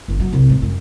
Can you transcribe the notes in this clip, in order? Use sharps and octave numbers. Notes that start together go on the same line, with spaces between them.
G1
F#3
C2
G#2
F#2